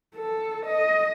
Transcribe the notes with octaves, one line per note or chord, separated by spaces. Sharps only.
A4
D#5